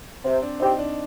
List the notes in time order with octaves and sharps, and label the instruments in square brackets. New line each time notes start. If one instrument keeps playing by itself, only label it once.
[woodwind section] C3 [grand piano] C4
[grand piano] D4
[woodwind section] F3 C4 G4 [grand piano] D#4
[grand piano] D4